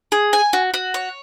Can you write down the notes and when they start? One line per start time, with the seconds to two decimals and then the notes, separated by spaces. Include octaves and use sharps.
0.12 G#4
0.33 G#5
0.53 F#4
0.74 F#4
0.94 C#5